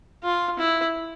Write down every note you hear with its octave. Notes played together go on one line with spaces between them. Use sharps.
F4
E4